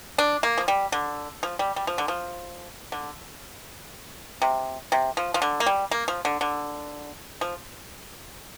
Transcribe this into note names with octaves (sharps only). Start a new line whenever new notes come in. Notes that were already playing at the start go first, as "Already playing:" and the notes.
D4
A#3
F3
G3
D3
F3
G3
G3
F3
D3
F3
D3
C3
C3
F3
F3
D3
A#3
G3
A#3
F3
D3
D3
F3